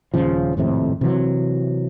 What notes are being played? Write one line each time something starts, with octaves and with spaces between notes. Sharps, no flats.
D#1 C#3 F3
G#1 F2 A2 C3
C3 E3 F#3